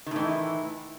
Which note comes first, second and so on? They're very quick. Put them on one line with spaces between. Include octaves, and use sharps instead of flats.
D#3 A2 E3